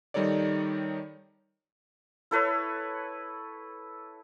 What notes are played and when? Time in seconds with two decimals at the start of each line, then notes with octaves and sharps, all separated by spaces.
0.14 D#3 G3 D#4 A4 C#5 D5
2.31 E4 A4 B4 C#5